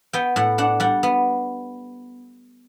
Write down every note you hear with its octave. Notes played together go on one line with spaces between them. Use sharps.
B3 G5
A2 F#5
D4 F#5
G3 F#5
B3